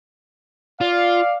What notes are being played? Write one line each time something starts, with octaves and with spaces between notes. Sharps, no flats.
F4 D5 F5